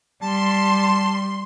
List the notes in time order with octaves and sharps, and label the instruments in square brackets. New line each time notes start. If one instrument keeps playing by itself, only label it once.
[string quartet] G3 [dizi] A5 [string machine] C6